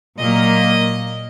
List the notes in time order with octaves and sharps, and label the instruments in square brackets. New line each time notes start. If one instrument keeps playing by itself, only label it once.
[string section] A#2 F#3 A#3 D#5